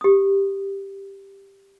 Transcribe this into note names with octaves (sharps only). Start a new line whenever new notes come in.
G4 D#6